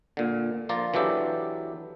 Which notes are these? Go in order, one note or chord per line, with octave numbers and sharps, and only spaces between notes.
A#2 D3
F3 F4 A#4 D5
E3 F#3 D4 G4 A4